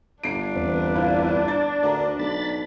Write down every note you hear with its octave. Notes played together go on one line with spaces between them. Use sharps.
G1 D4 C7 D7
E2 C4 B4
E4 F5
A6
D2 A#4 D5 A#5
B1 B5 A6